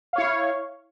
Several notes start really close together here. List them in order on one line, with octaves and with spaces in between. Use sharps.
F5 C#5 E4